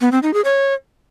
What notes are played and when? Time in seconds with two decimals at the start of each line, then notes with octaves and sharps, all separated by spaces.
0.01 B3
0.12 C4
0.23 D#4
0.34 G#4
0.45 C#5